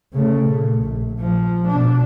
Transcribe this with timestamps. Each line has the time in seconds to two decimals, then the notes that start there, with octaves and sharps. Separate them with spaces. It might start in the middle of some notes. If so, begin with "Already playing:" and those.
0.13 C#3 A3
0.48 A#2
0.80 A#1
1.19 F3
1.68 B2 D4